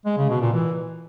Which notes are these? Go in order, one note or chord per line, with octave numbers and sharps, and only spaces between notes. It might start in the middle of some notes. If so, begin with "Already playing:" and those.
G#3
C#3
B2
A#2
E3